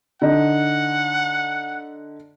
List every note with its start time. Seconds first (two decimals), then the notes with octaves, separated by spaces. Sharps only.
0.22 D3 D#4 F#5